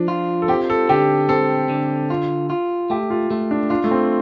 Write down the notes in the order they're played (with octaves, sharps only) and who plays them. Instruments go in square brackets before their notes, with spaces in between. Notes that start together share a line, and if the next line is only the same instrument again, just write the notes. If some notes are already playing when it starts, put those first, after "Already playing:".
Already playing: [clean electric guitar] F3 [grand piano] D4
[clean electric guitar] F4
[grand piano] A4
[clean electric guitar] C4 [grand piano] G4
[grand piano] A4
[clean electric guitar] D3 [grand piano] G4
[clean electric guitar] C4 [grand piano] A4
[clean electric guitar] D3
F4
F4
[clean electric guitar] A3 [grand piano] G4
[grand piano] F4
[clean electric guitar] A3 [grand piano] F4
[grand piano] D4
[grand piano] D4 [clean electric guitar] F4
[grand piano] A3
C4